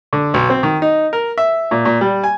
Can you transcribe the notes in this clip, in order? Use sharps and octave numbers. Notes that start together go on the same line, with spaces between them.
D3
B1
C4
D#3
D#4
A#4
E5
A#2
A#2
G3
G#5